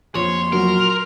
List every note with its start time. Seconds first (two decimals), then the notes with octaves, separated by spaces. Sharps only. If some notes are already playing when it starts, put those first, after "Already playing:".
0.15 F2 A#2 F3 C#5 C6
0.53 F#3 A#4